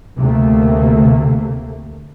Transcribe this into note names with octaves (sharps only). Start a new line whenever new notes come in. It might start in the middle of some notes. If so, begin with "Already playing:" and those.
D2 C3 A3 A#3